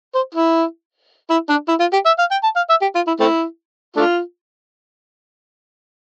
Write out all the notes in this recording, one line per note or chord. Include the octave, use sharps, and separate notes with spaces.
C5
E4
E4
D4
E4
F4
G4
E5
F5
G5
A5
F5
E5
G4
F4
E4
A3 C4 E4
A3 D4 F4